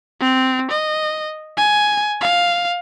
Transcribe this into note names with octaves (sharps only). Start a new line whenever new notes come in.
C4
D#5
G#5
F5